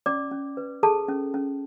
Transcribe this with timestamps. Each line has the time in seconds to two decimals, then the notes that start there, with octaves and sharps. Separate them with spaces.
0.06 C#4 D5 D6
0.31 C#4
0.57 B4
0.83 G#4 A4 A5
1.08 C#4
1.34 C#4